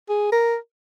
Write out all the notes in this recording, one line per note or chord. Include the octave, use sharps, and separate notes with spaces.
G#4
A#4